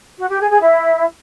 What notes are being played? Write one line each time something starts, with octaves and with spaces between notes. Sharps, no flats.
F#4
G4
G#4
G#4
E4